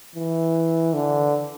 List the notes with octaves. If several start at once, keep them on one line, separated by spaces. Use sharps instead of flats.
E3
D3